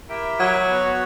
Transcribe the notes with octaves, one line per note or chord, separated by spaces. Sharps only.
E4 G4 A#4 E5 G5
F#3
B3 F#4 C#5